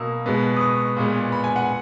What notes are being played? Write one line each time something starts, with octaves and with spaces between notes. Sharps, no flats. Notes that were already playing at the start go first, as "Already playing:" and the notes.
Already playing: B2 A#3 D#6 E6
B2 G#3 B3
D#6
C#6
A#2 G#3 B3
B5
G#5
F#5